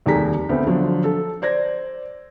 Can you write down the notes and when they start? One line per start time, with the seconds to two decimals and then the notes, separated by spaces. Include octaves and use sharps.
0.06 F1 D#2 G3 G#4 A#5 B6
0.49 D2 B3 C4
0.67 D3 F3 F#3
1.04 A4
1.42 C5 D5 G#6 A#6